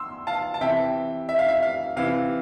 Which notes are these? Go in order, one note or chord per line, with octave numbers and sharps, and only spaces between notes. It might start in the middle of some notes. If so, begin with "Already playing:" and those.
Already playing: B2 C6 E6
F5 A5
A5
C3 E3 E5 G5
E5
F5
E5
F5
C3 E3 F5